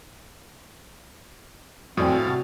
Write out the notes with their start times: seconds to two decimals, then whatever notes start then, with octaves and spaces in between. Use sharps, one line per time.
1.97 F2 A2 F3 C4 F#4 D5 G#5 D#6
2.12 F5 A5
2.26 C3 F#4